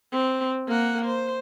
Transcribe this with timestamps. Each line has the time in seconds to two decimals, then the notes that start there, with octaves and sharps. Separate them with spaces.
0.12 C4
0.67 A#3 F#5
1.06 C5